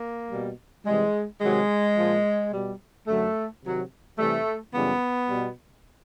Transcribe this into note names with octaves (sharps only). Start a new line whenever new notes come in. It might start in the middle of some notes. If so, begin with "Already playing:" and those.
Already playing: A#3
B2 G3
C3 E3 G3 G#3
C3 D#3 F#3 G#3
A#2 F3
B2 G3
F#2 D3 F#3 A3
C3 D#3 F#3
C3 E3 G3 A3
F#2 C#3 E3 G3 B3
B2 G3